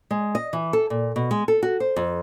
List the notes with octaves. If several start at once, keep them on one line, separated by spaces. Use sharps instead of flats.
G#3
D#5
E3
A4
A#2
B2
G#3
A4
F#4
C5
F2